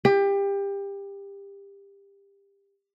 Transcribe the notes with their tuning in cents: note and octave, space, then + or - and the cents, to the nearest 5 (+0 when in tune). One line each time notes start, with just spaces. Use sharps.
G4 +25